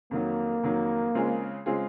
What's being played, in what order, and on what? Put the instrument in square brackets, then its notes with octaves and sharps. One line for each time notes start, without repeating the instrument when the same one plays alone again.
[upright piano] F2 D#3 F#3 [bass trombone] A#3
[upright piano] F2 D#3 F#3
C#3 G#3 C4 F4 G#4
C#3 G#3 C4 F4 G#4